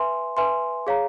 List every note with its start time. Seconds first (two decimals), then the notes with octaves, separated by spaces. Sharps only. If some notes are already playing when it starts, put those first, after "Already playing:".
Already playing: B4 E5 G#5 C6
0.37 B4 E5 G#5 C6
0.87 G#4 C#5 F5 A#5